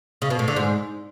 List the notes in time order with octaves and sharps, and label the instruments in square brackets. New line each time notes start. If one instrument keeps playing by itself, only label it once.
[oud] C#3
B2
A2
D3
G#2